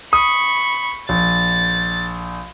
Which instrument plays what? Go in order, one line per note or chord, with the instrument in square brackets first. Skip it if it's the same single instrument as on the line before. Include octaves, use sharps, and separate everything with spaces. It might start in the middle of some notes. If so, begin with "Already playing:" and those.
[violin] B5 C#6 [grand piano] D#6
[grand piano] A#1 [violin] A6